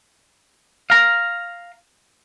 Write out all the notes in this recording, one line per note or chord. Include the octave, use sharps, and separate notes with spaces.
F5 A#5